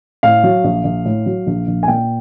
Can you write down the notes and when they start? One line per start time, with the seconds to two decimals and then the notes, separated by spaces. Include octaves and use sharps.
0.23 A2 F5
0.44 F#3
0.64 A#1
0.84 A#1
1.05 A2
1.26 F#3
1.47 A#1
1.67 A#1
1.83 G#5
1.88 A#2 G5